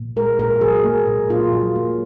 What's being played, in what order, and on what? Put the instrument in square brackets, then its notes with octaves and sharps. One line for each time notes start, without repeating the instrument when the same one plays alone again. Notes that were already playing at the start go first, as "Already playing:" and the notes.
Already playing: [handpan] A#2
G#3 A#4
A#2 A#4
F#3 G#4
A#3
A#2
A#2 F4
F#3
A#3